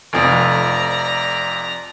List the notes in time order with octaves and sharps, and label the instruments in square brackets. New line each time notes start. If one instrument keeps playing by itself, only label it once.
[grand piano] F1 F2 [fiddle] D5 A#5